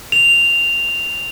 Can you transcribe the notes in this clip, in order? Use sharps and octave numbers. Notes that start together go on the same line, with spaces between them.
F7